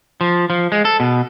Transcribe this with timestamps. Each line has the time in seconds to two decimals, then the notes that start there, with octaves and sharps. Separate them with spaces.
0.21 F3
0.50 F3
0.72 G#3
0.85 A4
1.00 B2